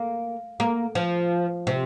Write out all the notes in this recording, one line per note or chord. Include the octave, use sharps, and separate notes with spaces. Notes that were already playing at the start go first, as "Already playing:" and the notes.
Already playing: A#3
A#3
F3
C3